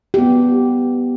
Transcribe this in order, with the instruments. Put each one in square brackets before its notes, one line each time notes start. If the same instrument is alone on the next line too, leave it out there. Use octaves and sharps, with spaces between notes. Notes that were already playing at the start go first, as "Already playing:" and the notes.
[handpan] B3 G4